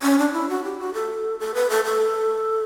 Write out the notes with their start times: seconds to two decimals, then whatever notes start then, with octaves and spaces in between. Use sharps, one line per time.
0.02 C#4
0.18 D4
0.33 E4
0.49 F#4
0.64 G4
0.79 F#4
0.94 A4
1.40 A4
1.54 B4
1.70 A4
1.85 A4